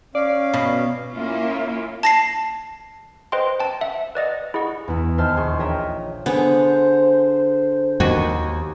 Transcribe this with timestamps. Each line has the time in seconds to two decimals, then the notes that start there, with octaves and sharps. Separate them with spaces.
0.15 C#4 D5 F5
0.54 B2
1.14 A#3 C#4 E4 F4
2.03 A5 A#6 C7
3.32 B4 C5 D#5 G5 C6
3.60 G5 A5
3.81 E5 F#5
4.15 B4 D5 D#5 F#5
4.54 E4 G#4 D#5 F#5 C#6
4.88 E2 B3 E4
5.18 D#2 C5 E5 A5 E6 F6
5.37 A#1 G#4 C6 C#6
5.59 A#4 C#5 D#5 E5 G5 A#5
6.26 D3 B3 G#4 C5
8.00 D#2 D#3 F#4 G#5